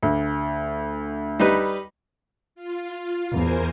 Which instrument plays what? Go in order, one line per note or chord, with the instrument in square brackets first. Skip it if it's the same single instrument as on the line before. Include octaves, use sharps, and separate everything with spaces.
[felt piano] D2
[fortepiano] G3 D#4 B4
[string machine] F4
[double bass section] E2 [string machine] A#4 C5 G#5